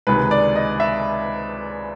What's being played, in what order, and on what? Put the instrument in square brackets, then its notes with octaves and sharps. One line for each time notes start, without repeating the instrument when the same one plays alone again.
[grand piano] C#2 C3 D#3 G#3 B4
D5
D#5
E5